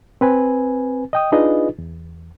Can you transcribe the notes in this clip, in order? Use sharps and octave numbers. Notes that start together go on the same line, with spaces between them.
C4 B4 G#5
D#5 G5 D#6
D4 D#4 F4 G#4 B4 D#5
E2